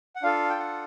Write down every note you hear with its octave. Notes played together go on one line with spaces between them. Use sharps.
F#5
D4 F4 A4 F5
G5
F#5